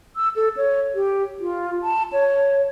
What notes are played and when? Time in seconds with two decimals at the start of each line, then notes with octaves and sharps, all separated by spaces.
0.16 E6
0.36 A4
0.57 C#5
0.95 G4
1.40 F4
1.83 A5
2.13 C#5